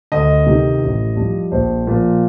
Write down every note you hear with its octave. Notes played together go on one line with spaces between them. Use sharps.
D2 D#5
C3 D#3
A1
G2 F3
A#1 C5
A#2 F3